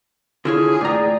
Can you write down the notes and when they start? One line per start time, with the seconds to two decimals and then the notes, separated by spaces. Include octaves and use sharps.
0.45 D3 E4 F4 G#4 C#5
0.81 A2 D5 G5 A#5